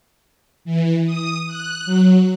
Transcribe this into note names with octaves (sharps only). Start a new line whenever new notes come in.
E3
D#6
F#6
F#3